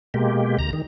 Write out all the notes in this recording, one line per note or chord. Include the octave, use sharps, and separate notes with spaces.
B2 G#3 A#3 G4
D2 A#5
D#3